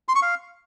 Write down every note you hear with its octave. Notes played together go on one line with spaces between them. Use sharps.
C6
C#6
F5